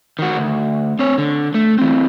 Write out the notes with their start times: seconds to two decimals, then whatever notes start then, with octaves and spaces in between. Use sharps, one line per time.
0.19 D#3 F#4
0.37 D2
0.99 C4 C#5
1.18 D3
1.54 A3
1.79 E3 C4